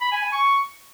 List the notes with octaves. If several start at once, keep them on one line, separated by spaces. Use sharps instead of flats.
B5
G#5
G#5
C#6